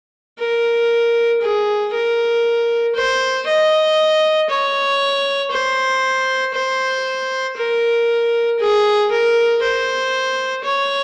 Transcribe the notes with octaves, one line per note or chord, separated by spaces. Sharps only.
A#4
G#4
A#4
C5
D#5
C#5
C5
C5
A#4
G#4
A#4
C5
C#5